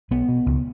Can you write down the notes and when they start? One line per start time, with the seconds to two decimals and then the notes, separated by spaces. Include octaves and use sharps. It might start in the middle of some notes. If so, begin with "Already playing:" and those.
0.11 B1 B3
0.28 B2
0.46 C#2